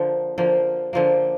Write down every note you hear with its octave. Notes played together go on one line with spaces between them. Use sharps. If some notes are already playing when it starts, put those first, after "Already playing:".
Already playing: D3 F3 A#3
D3 F3 A#3
D3 F3 A#3